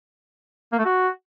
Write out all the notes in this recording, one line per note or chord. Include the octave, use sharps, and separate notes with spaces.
A#3
A3
F#4